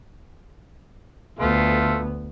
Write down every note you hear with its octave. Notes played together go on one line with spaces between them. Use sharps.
D2 A3 B3 F4